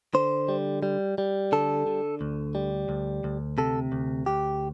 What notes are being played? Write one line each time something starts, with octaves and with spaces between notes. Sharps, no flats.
D3 C5
G3
G3
G3
D3 A4
D3
D2
G3
D2
D2
C3 A4
D2
D2 G4